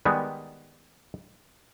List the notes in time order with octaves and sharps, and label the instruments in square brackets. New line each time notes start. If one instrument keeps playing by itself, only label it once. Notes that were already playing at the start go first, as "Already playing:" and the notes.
[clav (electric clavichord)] D#3 G3 G#3 B3